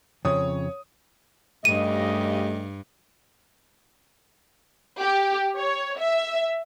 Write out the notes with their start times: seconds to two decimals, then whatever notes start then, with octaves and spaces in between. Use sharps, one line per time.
0.25 F2 C#3 C#5 D#6
1.65 G2 C#3 A3 G4 D#5 D#7
5.01 G4
5.57 C#5
5.98 E5